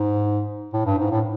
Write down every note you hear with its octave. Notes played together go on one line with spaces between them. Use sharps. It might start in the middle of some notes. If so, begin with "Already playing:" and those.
Already playing: G#2
A2
G2
G#2
A2